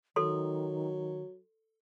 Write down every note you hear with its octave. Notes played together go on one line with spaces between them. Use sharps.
D#3 F#3 A4 C6